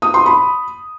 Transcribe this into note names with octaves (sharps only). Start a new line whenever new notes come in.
D#6
C6
B5